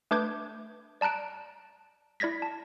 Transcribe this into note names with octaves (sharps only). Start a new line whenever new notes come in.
A3 D4 B4 D6 G6 G#6
D5 A5 A#5 F#6 D7
E4 D5 G#6 A#6 B6
A5